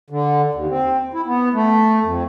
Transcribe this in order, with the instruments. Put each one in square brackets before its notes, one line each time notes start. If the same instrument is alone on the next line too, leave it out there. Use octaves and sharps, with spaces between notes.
[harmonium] D3
D#2
C4
E4
B3
A3
F2